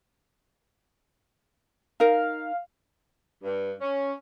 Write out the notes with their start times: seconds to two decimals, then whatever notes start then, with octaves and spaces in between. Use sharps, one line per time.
2.00 D#4 A#4 F5
3.43 G2
3.80 C#4